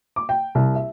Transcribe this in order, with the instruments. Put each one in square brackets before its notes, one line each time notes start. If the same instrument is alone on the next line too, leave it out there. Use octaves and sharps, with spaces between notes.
[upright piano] D6
G5
C2
E5